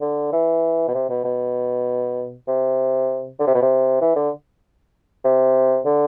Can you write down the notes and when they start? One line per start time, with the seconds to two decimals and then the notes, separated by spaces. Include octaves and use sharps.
0.01 D3
0.32 E3
0.88 B2
0.94 C3
1.09 B2
1.25 B2
2.48 C3
3.39 D3
3.47 C3
3.55 B2
3.62 C3
4.01 E3
4.16 D3
5.25 C3
5.85 D3